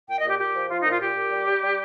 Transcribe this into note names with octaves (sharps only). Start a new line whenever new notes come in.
A#2 G5
A#2 D#5
G4
A#2 G4
F3
F3 F4
A#2 D#4
F4
A#2 G4
A#2
G3
G3
G3